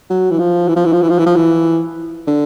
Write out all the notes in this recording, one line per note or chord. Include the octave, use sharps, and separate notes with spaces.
F#3
E3
F3
E3
F3
E3
F3
E3
F3
E3
F3
E3
D3